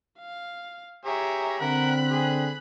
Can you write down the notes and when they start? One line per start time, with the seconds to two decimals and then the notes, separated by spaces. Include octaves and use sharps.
0.19 F5
1.05 G4 G#4 C#5 E5 A#5
1.60 D3 C4 A#4 F#5 B5 F#6
2.10 G#4